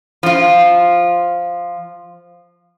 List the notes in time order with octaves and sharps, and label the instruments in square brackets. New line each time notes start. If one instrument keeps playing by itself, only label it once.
[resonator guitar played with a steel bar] F3 F4